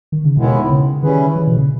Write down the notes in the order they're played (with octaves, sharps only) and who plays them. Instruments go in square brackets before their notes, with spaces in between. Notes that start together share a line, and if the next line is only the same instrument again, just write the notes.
[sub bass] D#3
C#3
[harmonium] D#2 D#3 G#3 B3 E4 [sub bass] B2
[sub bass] C#3
[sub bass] D#3 [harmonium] G3 C#4 E4 G#4 B4
[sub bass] E3
B2
C#3